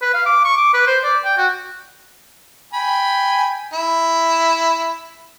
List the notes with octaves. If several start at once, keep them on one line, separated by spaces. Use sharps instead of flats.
B4
F5
D6
C#6
D6
B4
C5
D5
G5
F#4
G5 G#5 B5
E4